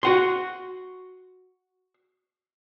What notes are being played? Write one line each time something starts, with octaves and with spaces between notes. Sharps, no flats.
F#4 F#5 C6